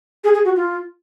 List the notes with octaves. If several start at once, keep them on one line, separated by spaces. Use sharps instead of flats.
G#4
G#4
F#4
F4